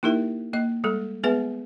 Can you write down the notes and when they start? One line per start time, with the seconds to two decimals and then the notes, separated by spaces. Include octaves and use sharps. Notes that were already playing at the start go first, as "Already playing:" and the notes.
0.03 A#3 D#4 E4 G4 A#4 E5
0.53 A#3 D#5
0.84 G3 G#3 A4
1.23 G#3 B3 G#4 B4 E5 G#5